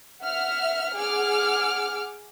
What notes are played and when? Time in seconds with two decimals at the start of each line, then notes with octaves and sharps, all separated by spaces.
0.22 E5 F#5 F6
0.97 G#4 F#5 D6 F6